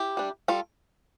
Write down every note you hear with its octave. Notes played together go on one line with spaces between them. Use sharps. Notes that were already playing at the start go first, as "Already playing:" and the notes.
Already playing: E4 G4
G3 D4
G3 F4 A4